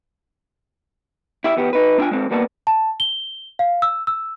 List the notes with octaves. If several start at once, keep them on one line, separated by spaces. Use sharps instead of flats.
E4 G4 E5
E2 B3 G4
D#4 B4
D4 E4 F4 G5 G#5
G#3 C4 A4
E2 G3 A#3 B3 G5 A5
A5
G7
F5
E6
E6